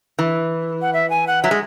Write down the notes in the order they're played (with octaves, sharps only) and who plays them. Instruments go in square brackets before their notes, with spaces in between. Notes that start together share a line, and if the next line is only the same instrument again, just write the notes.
[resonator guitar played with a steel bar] E3
[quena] F#5
E5
G#5
F#5
[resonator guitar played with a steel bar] F#3 [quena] E5
[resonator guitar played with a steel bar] G#3